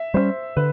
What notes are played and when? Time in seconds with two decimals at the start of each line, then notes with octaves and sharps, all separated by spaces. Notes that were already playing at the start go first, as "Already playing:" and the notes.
Already playing: E5
0.14 G3 A#3 C#4 C5
0.57 D3 B4